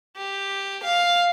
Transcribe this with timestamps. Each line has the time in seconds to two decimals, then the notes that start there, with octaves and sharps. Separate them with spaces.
0.17 G4
0.84 F5